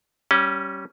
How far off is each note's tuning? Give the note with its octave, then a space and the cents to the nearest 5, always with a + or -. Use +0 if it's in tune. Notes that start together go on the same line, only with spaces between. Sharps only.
G3 -20 C#4 -5